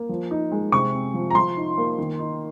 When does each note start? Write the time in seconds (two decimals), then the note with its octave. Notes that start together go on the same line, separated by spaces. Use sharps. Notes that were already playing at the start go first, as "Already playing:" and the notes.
Already playing: A#3
0.09 F3
0.31 D#4
0.52 G#3
0.72 C3 C#6
0.93 C4
1.14 F3
1.30 A#5
1.35 F3 C6
1.57 D#4
1.77 A#3
1.98 D#3
2.19 D#4